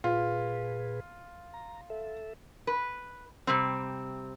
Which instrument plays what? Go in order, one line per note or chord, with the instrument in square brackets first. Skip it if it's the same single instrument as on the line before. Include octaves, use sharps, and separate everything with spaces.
[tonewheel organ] A#2 G#4 B4 [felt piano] F4
[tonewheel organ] A#5
A4 E5
[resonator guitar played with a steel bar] B4
C3 G3 C4